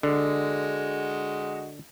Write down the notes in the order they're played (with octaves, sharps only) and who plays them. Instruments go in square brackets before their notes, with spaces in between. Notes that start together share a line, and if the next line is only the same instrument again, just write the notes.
[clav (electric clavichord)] D3 [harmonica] G#3 F#4 D#5